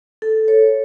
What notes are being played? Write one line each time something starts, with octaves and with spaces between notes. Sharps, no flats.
A4
C#5